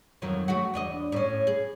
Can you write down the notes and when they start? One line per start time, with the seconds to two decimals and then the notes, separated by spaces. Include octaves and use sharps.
0.22 F2 D#3 F#3
0.48 A3 F#4
0.74 E2 D4 D#5
1.12 A2 C#4
1.47 G#4